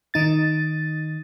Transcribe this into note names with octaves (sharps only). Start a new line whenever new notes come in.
D#3 D#4 A6